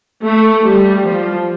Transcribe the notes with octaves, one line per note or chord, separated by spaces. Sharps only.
A3
G3
F3